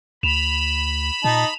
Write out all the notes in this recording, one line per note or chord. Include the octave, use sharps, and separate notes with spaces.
D2 B5 E7 F7
A#2 D#4 A5 A#5